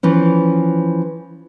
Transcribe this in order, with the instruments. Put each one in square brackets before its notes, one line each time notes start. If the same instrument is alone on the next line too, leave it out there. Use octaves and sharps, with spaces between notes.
[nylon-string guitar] E3 F3 C#4